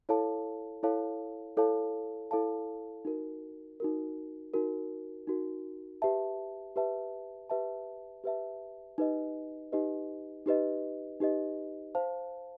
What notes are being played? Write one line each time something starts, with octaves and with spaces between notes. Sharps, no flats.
E4 A4 C#5 F5 A5
E4 A4 C#5 F5 A5
E4 A4 C#5 F5 A5
E4 A4 C#5 F5 A5
D#4 F#4 A#4
D#4 F#4 A#4
D#4 F#4 A#4
D#4 F#4 A#4
G4 B4 E5 A5
G4 B4 E5 A5
G4 B4 E5 A5
G4 B4 E5 A5
D#4 G4 B4 D#5
D#4 G4 B4 D#5
D#4 G4 B4 D#5
D#4 G4 B4 D#5
C5 F5 A5